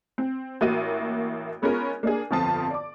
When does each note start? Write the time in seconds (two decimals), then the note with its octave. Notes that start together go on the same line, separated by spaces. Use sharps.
0.18 C4
0.61 A1 A#3 E4 F#4 D#7
1.62 G#3 B3 C#4 F4 G#4 A#4
2.03 A#3 D4 G#4
2.31 G1 F2 F3 F4 A5 D#6
2.70 D5 D6